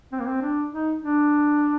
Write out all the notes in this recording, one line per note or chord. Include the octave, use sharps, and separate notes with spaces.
C4
A#3
C4
D4
D#4
D4